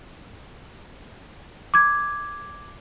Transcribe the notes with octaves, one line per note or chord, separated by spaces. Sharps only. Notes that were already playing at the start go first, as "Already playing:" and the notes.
D6 G#6